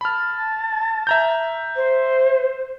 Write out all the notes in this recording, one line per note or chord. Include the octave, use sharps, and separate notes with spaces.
A5 B5 F6
E5 A#5 G6
C5